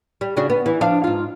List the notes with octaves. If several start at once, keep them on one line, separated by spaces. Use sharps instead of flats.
G3
C#3 D4 F#4
B3
E3
F3 D4 F5
G#2 F4